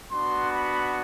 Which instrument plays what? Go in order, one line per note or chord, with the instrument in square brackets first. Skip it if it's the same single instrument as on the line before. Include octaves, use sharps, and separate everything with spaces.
[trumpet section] B3 D4 F#4 C6
B5